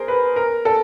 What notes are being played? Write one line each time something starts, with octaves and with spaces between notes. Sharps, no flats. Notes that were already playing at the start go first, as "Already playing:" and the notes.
Already playing: G#4 A#4 C5
B4
A#4
A4